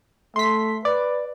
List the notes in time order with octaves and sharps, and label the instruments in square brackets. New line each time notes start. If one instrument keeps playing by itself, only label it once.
[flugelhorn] A3 [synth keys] C6 B6
[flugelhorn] B4 [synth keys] D5